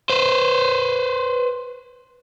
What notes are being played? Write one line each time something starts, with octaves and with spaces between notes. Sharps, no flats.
B4 C5